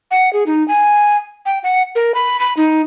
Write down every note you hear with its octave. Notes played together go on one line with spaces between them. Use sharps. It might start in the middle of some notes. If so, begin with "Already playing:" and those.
F#5
G#4
D#4
G#5
G5
F#5
A#4
B5
B5
D#4